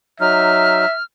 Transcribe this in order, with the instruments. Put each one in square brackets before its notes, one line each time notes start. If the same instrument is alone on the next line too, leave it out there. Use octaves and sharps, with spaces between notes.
[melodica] F#3 D#4 [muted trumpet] E5 [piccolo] F6